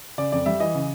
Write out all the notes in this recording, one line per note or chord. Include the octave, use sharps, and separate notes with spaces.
C#3 D5
F2 D5
G3 E5
E3 D#5
C#3